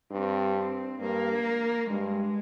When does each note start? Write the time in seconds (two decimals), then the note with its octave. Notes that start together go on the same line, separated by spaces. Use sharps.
0.11 G2 C4
0.57 C4
1.00 G2 A#3
1.89 G2 G#3